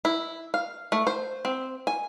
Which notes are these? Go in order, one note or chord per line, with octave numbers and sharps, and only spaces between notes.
E4
F5
A3
C5
C4
G#5